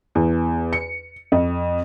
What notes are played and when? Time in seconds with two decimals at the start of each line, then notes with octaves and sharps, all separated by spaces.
0.15 E2
0.73 C#7
1.32 F2